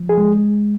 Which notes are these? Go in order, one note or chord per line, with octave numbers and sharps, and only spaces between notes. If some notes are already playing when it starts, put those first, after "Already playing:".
Already playing: F3
G#4
G#3